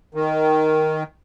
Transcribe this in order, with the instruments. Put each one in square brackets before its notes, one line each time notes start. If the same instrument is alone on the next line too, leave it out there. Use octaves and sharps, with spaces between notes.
[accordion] D#3